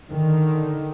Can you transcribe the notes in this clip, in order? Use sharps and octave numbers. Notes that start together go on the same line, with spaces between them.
D3 D#3